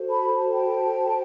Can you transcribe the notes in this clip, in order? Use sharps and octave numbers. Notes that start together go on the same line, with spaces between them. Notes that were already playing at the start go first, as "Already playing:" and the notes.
Already playing: F#4 A4 C5
A5 B5
G5 A5